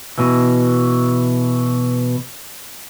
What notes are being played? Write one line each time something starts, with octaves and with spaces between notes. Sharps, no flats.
B2 E3